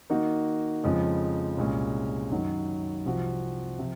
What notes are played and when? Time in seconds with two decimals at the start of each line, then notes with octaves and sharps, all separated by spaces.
0.10 D#3 A#3 D#4 F#4
0.84 F2 C#3 F3 G#3
1.58 C2 A#2 G#3 C#4
2.32 F#2 D#3 F#3
3.05 C2 C3 F3 C4 F#4
3.79 C3 F3